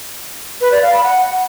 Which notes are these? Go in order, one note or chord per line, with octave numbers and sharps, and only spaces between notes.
B4
D5
F5
B5
F#5